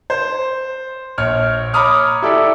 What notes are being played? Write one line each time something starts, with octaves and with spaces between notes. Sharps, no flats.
C5
A#1 C#5 F6
C#5 A#5 B5 D6 D#6 F6
E4 G4 A4 D5